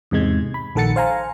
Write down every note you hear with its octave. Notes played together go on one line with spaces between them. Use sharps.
E2 G#2 C3 G#3 G#6
B5
A#1 D#3 A4 F#5 A6 C#7
C5 F5 G#5 A#5